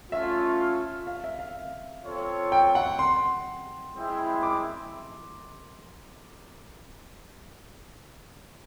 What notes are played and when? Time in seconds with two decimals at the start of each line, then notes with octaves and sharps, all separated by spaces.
0.11 A3 C#4 F4 E5
1.07 F5
1.24 E5
1.39 F5
2.04 C4 F4 A4 C#5
2.52 G5
2.75 F#5
2.99 C6
3.96 G#3 C4 E4
4.43 D6